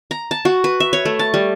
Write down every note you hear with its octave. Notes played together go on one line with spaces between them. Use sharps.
A#5
A5
F#4
B4
E5
C#5
A3
A5
G3